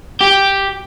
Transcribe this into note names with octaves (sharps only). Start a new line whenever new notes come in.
G4